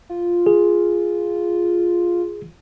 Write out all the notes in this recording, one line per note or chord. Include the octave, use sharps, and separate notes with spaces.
F4
G#4